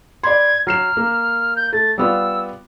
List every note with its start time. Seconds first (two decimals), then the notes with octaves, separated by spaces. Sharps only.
0.23 D5 B5 C6 G#6
0.67 F#3 F6 C7 E7
0.97 A#3
1.56 G6
1.73 A3 A6
1.98 G3 B3 F4 E6